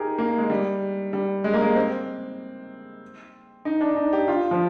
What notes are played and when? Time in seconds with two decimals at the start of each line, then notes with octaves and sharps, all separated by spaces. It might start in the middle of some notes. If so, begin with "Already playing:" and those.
Already playing: D#4 G4 G#4 A#4
0.18 A#3
0.38 G#3
0.50 G3
1.13 G3
1.44 G#3
1.54 A#3
1.62 G#3
1.76 C4
3.65 D#4
3.81 D4
3.96 D#4
4.13 G4
4.28 F4
4.51 F3